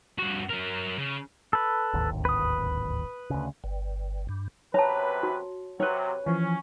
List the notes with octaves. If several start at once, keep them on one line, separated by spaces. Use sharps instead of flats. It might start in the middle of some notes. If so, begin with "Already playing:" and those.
G2 F#4
F#3 A#4
C#3
A4 B4
D1 G#1 D#2
B4 D#6
D2 C#3
G1
G2
F#2 C3 B4 C#5 A5 A#5
F#4
C3 F#3 B4 C#5
E3 F3 C#4